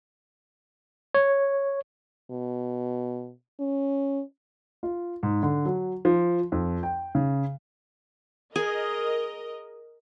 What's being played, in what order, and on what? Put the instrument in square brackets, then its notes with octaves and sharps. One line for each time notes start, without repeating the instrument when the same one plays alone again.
[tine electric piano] C#5
[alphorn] B2
C#4
[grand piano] F4
G#2
D3
F#3
F3
F2
G5
C#3
[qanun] G#4 [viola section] A#4 D#5